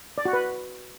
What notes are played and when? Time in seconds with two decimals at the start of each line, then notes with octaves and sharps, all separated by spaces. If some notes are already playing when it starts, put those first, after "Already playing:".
0.18 D5
0.25 F#4
0.33 B4